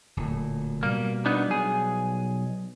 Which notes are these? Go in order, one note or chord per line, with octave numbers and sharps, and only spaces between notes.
D1 A#2
B2 G3 A#3
B3 D4 D#4
B1 G#4